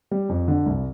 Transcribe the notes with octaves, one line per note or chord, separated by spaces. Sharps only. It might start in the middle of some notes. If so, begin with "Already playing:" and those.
G3
F2
D3
C2